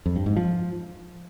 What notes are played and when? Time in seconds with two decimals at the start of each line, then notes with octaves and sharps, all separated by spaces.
0.06 F2
0.16 G2
0.26 G#2
0.36 F3